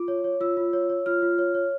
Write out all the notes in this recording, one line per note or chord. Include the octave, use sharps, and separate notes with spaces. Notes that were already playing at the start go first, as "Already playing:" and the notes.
Already playing: F4 D6
C#5
C#5
F4 E6
F4
C#5
C#5
F4 F6
F4
C#5
C#5